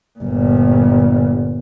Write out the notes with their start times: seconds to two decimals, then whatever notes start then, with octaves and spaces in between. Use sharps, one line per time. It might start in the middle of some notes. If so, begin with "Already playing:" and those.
0.19 G1 A#2